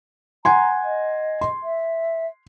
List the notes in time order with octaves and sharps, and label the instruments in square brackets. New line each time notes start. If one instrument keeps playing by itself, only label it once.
[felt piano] F#5 G#5 C6 [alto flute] A#5
[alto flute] D#5
[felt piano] C6
[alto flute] E5